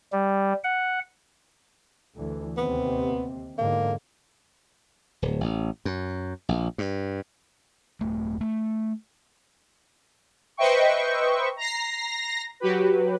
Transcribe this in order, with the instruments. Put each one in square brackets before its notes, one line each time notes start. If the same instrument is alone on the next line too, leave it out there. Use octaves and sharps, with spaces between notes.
[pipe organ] G3
F#5
[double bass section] D2 E3
[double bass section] D#2 C3 C4 [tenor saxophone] B3
[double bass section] E2 G#2 D3 [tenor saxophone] A#3
[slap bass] D1
A1
F#2
A#1
G2
[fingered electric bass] D#1 A3
A3
[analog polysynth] B4 C5 D#5 E5 G5 C#6
A#5 A#6 C7
F#3 F#4 G4 B4